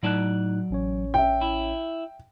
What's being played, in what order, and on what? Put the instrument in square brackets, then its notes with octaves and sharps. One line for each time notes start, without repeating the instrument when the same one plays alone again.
[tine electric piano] A2 D#4 F#6 [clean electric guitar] F#3 D5 A5
[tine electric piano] A1 C#4 C#5
[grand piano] E5 G5
[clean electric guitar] E4